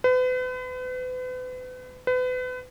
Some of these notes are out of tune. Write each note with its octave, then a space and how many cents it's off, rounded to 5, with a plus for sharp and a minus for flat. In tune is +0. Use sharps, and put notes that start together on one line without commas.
B4 +40
B4 +35